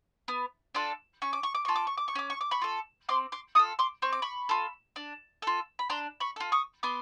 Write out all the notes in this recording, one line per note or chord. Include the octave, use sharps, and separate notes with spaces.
B3
D4 F4 A4
C#4 C#6
D6
C#6
D6
F4 A4 C#6
D6
C#6
D6
C#6
C#4 D6
C#6
D6
B5 C#6
F4 A4
C4 C6 D6
C6 D6
F4 A4 C#6 D#6
C6 D6
C4 C#6
D6
B5 C#6
F4 A4
D4
F4 A4
B5
D4 A#5 C6
B5 C#6
F4 A4
C#6 D#6
B3 C6 D6